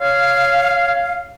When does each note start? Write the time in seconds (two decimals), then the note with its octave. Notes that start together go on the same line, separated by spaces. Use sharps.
0.01 C#5 F5